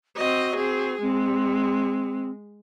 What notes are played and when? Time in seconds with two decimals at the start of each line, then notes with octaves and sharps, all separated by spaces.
0.17 C4 F#4 D#5
0.56 C4 G#4
1.02 G#3 C4